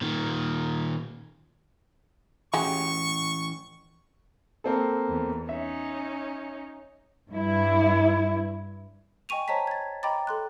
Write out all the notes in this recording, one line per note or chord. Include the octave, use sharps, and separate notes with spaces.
A#2 D#3
E3 G#3 C#4 F#4 G4 C#6
A#3 C4 A4
E2
C#4 D#4 E5
G2 E4
D#5 G5 G#5 C#6 D#7 F7
C5 C#5 D#5 A5 A#5 B6
G#6 A6
D#5 G5 A#5 B5 D6 A6
A4 C6 F#6